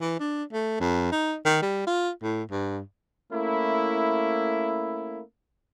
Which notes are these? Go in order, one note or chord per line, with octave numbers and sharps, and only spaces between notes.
E3
D4
A3
F2
D#4
D#3
G3
F4
A2
G2
A3 A#3 C#4 E4